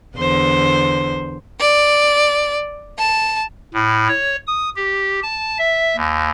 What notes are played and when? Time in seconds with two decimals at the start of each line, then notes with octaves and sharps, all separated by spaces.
0.18 E2 D3 C5
1.60 D5
2.99 A5
3.74 A2
4.08 C#5
4.47 D#6
4.76 G4
5.23 A5
5.59 E5
5.96 D#2